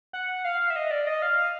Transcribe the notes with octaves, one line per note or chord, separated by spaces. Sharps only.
F#5
F5
F5
E5
D#5
D5
D#5
F5
F5